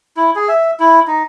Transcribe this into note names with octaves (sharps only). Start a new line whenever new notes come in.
E4
G#4
E5
E4
D#4